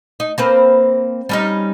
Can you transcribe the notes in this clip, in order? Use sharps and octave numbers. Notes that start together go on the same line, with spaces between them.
D#4
A#3 C4 B4
G3 C#4 D#4